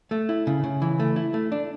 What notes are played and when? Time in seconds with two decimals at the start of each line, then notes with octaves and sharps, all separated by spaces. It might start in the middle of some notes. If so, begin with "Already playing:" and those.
0.11 A3
0.29 E4
0.47 C#3
0.64 C#3
0.82 E3
1.00 A3
1.16 E4
1.34 A3
1.52 D4